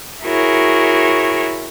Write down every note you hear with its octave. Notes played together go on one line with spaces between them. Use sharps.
E4 F#4 G#4 A#4 C#5